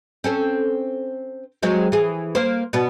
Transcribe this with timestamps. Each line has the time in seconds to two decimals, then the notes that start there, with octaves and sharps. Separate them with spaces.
0.24 C4 C#4 A4
1.63 F#3 G#3 C4
1.92 E3 G#4
2.35 A#3 C5
2.73 B2 B3 D4